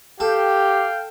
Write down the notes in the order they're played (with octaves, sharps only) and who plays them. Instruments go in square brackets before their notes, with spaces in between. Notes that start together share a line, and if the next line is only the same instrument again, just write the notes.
[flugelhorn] G4 [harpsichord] A4 [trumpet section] F5 G5